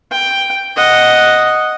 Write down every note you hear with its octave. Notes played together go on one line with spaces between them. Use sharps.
G5
D#5 F#5